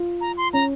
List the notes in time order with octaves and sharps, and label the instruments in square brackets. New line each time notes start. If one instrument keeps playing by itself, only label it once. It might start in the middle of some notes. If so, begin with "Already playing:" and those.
Already playing: [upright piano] F4
[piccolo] A#5
C6
[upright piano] C#4 [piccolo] A#5